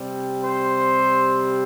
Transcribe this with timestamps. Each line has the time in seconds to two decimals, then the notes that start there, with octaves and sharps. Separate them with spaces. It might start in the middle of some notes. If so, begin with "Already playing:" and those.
Already playing: C3 G3 C4
0.44 C5